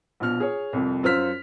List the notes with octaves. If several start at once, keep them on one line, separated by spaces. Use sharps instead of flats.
A#1 B2 F6 F7
G#4 C#5
C2 F2
F#2 F4 C5 E6 F6 B6